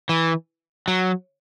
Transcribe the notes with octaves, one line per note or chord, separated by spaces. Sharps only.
E3
F#3